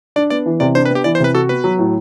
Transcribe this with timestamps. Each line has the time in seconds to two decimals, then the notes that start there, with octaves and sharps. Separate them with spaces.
0.16 D4 D5
0.30 B3 D5
0.46 E3
0.60 C3 D5
0.75 D4 C5
0.85 B4
0.90 B3
0.95 G4
1.04 E3 D5
1.15 C5
1.20 C3 B4
1.34 F#4 A4
1.49 B3 B4
1.64 F#3
1.79 A2